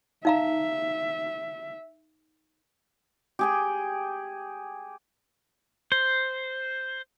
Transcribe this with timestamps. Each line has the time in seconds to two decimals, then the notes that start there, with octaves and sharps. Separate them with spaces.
0.25 D#4 E5 F5 A#5
3.39 G4 G#4 G5
5.92 C5